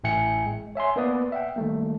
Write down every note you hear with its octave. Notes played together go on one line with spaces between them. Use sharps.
A1 A2 E5 G5 G#5 C#7
G#3
C#5 E5 G#5 C6
A#3 B3 B4 D5 D#6
E5 F#5 G5
D#3 G3 A3 A#3